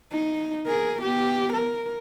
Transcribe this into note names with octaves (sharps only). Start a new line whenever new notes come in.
D#4
G#4 A#4
B3 G4
A#4